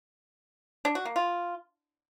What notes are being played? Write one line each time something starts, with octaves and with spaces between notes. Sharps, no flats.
D4
F#4
A#3
F4